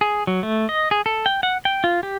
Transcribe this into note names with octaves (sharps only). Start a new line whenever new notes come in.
G#4
F#3
A3
D#5
G#4
A4
G5
F#5
G5
F4
G4